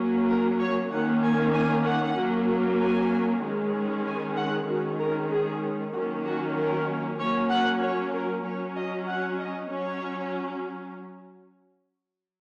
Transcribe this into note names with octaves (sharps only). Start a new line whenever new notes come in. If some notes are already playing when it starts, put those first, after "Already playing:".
Already playing: F#3 A#3 C#4
A#4
C#5
D#3 A#3 C#4 F#5
G#5
G#5
F#5
F#3 A#3 C#4
G#5
D#3 G#3 C#4
G#5
F#5
D#3 G#3 C#4 F#4
A#4
G#4
D#3 F#3 A#3 C#4 F#4
F#4
A#4
F#3 A#3 C#4 C#5
F#5
C#5
A#4
F#3 C#4 C#5
D#5
F#5
D#5
F#3 C#4 C#5